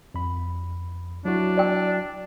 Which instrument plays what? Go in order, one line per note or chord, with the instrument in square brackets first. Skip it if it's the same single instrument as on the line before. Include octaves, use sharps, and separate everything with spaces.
[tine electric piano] F2 B5
[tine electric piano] F#3 E4 F#4 [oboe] D4
[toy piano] D5 G5